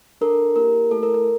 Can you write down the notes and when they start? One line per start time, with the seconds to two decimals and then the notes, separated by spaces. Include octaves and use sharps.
0.21 D4 A4 A#4
0.56 A#3 E4 G4 A#4
0.91 A3 E4 A4
1.03 A#4
1.14 A#4